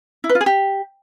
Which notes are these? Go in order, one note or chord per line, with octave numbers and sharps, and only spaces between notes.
E4
B4
F4
G#4
G4